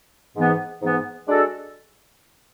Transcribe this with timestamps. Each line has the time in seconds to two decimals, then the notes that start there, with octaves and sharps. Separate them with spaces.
0.36 G#2 E3 B3
0.82 G#2 E3 B3
1.28 G#3 D4 F#4 A4